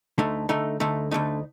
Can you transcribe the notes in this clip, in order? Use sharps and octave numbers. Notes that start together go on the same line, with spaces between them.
D2 D3 A3 D#4
D2 D3 A3 D#4
D2 D3 A3 D#4
D2 D3 A3 D#4